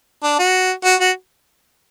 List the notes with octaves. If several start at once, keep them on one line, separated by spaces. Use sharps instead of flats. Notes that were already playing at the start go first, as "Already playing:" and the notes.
D4
F#4
F#4
F#4